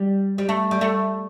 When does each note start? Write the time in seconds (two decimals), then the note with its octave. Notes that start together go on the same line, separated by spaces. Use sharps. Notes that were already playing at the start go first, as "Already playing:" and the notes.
Already playing: G3
0.38 G3
0.49 A3
0.71 G3
0.81 A3